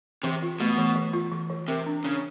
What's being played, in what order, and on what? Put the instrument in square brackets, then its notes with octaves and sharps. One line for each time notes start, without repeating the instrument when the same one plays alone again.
[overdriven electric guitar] C3 [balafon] E3
[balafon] F4
[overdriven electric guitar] B2 [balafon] A3
[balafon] E3
E3
F4
E3
E3
[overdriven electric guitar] C3 [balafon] A#4
[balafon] D4
[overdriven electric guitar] C#3 [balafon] D4